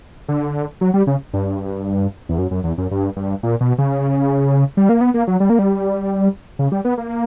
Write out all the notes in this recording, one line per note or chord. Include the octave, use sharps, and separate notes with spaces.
D3
F#3
G3
C#3
G2
E2
F#2
F#2
E2
F#2
G2
G2
A#2
B2
C#3
G3
A#3
B3
A#3
F#3
G3
A#3
G3
C#3
G3
B3
A#3